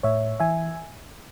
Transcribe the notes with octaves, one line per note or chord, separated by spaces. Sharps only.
A2 C#5 E5
E3 E5 G#5